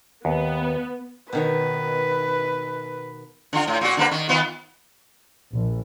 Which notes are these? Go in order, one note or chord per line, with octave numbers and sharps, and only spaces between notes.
D#2 B3
B2 D#3 B4 C#5
D3 F4
A2
A#2 F#4
D3 A#3 B4
D#3
D#3 B3 F4
A#1